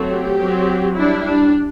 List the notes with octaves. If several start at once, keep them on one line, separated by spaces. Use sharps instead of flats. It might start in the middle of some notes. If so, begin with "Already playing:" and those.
Already playing: F#3 A3 C4
G4
F#3 C4
G3 D4 E4
D4